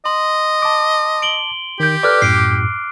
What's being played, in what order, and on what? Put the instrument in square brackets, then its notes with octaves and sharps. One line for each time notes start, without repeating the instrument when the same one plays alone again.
[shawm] D#5 [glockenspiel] C6
[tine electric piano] A5 D6
[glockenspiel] D7 F#7 G7
[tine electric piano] D#3 G6 [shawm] G4
[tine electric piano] A4 B4 D5 [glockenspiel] D6 F6 F#6
[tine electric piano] F#2 A2 [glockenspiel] C7 D7